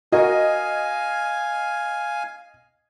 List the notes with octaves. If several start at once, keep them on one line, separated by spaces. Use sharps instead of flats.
F#4 A#4 D#5 F5 G#5